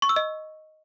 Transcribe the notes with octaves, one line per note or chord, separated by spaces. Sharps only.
C#6
E6
D#5